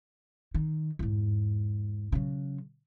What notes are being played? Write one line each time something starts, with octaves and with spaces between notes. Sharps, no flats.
D#3
E2 G#2
C#3 F#3